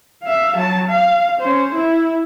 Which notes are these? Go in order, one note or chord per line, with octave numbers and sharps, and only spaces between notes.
E5 F5
F#3 A5
F5
C#4 C5
E4